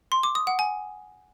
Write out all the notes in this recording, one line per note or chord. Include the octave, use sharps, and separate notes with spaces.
C6
D6
D#6
F#5
G#5